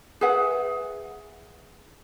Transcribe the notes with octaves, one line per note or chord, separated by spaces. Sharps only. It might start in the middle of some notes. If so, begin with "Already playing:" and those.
G#4 B4 E5 F#5